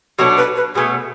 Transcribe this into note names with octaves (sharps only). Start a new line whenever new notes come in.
B2 F#3 A3 D4 C#5
B4
B4
B2 A3 C#4 G#4